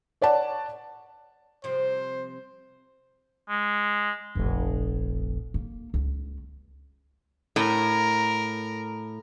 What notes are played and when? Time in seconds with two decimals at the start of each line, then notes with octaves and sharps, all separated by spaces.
0.22 C#5 D5 F#5 A5
1.64 C3 F3 G3 C5
3.49 G#3
4.35 F1 A#1
5.54 A#3
5.94 C#2
7.56 A2 A#4